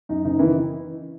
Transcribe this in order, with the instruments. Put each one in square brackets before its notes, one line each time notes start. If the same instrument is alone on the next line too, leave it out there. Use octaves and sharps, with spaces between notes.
[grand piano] F#2 D#4
F#1 D#4
D#3 E3 E4